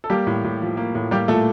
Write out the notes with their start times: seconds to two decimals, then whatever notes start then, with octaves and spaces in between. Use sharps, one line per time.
0.04 A4
0.10 G3 A#3 G4
0.27 A2
0.44 A2
0.61 F3
0.77 A#3
0.95 A2
1.11 G3 A#3 G4
1.28 A#2 A3 A4